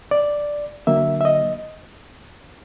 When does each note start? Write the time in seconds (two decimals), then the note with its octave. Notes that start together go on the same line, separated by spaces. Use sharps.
0.11 D5
0.87 D3 F#3 A#3 E5
1.21 E5
1.25 D#5